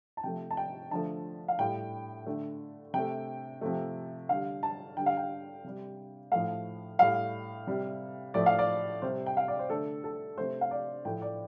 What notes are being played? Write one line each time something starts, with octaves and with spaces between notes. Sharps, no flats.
A5
C3 F3 A3 G5
A5
G5
D3 F3 A3 A5
F5
A2 G3 G5
D3 A3
C3 A3 G5
C3 F3 A3
D3 G3 F5
A5
D3 G3 G5
F5
G5
C3 G3
A2 F3 A3 F5
A2 G3 F5
C3 G3
A2 F3 A3 D5
F5
D5
C3 G3 C5
G5
F5
D5
C5
D3 A3 A4
A4
C3 A3 C5
F5
D5
A2 F3 A3 G5
D5